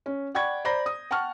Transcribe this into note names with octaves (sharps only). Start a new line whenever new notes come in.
C#4
D5 F#5 G5 B5 C#6 G#6
C5 D5 A#5 B5 G6 A#6
D#6
F#5 G5 A5 C#6 F6